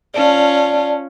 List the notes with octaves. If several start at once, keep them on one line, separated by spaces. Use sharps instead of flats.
C#4 F4 D5 A5